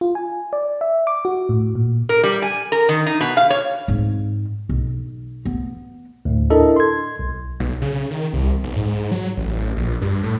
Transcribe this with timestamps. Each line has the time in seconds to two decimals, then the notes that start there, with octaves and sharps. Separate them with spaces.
0.01 F4
0.15 G#5
0.53 D5
0.81 E5
1.07 D6
1.25 F#4
1.49 A2
1.75 A#2
2.09 A#4
2.23 G3
2.42 G#5
2.72 A#4
2.89 D#3
3.07 D#4
3.21 B2
3.37 F5
3.50 C#5
3.88 G#2 C4
4.69 B1
5.45 B3
6.25 D2 A2
6.50 D4 E4 A4 A#4 D#5
6.76 C6 G#6
7.19 B1
7.60 B1
7.82 C#3
8.11 D#3
8.33 C2
8.64 B1
8.76 G#2
9.12 F#3
9.37 A1
9.77 A#1
10.01 G2
10.23 A2